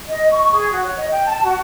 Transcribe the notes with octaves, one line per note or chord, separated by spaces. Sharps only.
D#5
C#6
G#4
F#4
C#5
D#5
G5
A5
F#4